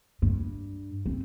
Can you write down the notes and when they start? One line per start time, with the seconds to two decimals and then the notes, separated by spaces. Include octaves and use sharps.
0.22 G2
1.06 C4